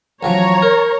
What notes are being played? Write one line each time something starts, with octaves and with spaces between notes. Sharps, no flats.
A1 F3 F#3 C#5 A#5
A#4